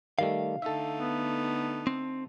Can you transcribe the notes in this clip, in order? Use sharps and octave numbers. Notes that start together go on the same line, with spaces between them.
D#3 G3 A3 F5
D3 A3 D#4 A4 E5
B3
C4